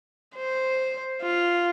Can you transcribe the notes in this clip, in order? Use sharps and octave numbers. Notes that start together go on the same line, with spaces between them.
C5
F4